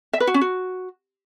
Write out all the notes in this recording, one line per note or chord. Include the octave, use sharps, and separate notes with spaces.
E5
B4
F#4
C#4
F#4